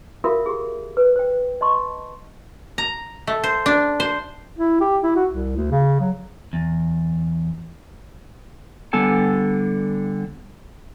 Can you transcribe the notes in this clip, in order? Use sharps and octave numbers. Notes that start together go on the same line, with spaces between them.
F4 F#4 A4 A#4 E5 F5
G4 G#4
B4
C5 G5
D#5 A5 C6 C#6
A#5
A3
C5
D4
C5
E4
G4
E4
F#4
C2
D2
C#3
F#3
E2
D3 G3 B3 A4 G#5 A5